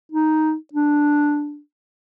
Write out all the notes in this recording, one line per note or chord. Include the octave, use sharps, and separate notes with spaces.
D#4
D4